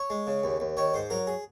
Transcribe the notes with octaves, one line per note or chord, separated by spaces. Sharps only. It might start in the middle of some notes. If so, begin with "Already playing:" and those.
Already playing: C#5
G#3
C#3
D#2
D#2
D#3 C#5
G#2 C5
F#3 A#4
G#4